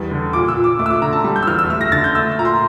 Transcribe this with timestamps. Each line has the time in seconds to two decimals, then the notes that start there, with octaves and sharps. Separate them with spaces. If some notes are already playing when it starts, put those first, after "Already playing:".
Already playing: E2 G3
0.11 D3
0.33 A#2 D6
0.48 E6
0.56 A#2
0.64 D6
0.79 A3 D6
0.86 E6
0.90 D6
1.02 D3 A#5
1.13 A5
1.24 G3
1.36 G6
1.43 E6
1.47 E2 F6
1.59 E6
1.70 A3 F6
1.81 A#6
1.92 D3 A6
2.04 G6
2.15 A3 E6
2.38 A#2 A#5
2.45 C6